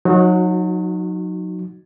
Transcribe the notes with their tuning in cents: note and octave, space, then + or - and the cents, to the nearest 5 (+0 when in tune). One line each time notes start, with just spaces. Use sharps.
F#3 -30 D#4 -5 F#4 +0